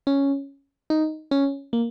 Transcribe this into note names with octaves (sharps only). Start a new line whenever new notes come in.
C#4
D#4
C#4
A#3